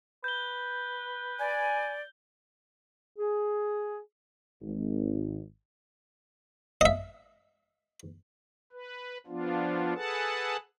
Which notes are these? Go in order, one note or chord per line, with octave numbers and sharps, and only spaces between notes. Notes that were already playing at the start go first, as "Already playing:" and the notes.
B4 G6 G7
D5 G#5
G#4
G#1
D#5 E5
B4
F3 B3 D4 F4
G#4 A4 B4 F#5 A5